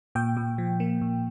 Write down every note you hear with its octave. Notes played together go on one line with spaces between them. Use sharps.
A#2 G5
A#2
F3
A#3
A#2